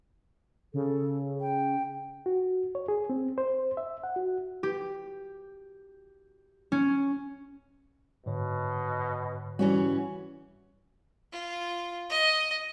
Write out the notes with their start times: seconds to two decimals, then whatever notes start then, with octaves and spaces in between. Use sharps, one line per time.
0.74 C#3 A4
1.41 G5
2.26 F#4
2.75 C#5
2.88 G#4
3.10 C4
3.38 C5
3.77 E5
4.04 F#5
4.16 F#4
4.63 G4
6.72 C#4
8.26 G#2 B2 D3 C#5
9.59 E3 G3 C#4 F#4
11.32 F4
12.09 D#5